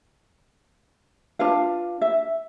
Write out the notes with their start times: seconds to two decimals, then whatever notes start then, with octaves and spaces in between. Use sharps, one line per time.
1.39 D4 F4 B4 F5
2.01 E5